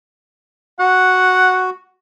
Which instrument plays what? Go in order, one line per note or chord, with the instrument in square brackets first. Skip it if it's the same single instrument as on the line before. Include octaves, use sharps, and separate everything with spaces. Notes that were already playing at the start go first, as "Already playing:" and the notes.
[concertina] F#4 [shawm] F#5